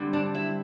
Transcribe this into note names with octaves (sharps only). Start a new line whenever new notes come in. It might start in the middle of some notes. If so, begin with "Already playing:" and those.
Already playing: D3 G3 C4
D4 D5
E4 E5